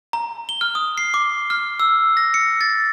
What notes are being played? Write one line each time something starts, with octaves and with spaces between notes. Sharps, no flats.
A#5
G7
F6
D#6
C7
D6
F6
E6
A#6
C#7
A6